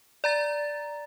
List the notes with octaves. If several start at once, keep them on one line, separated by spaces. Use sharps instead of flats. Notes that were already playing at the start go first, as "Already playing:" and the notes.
D5 A#5 A6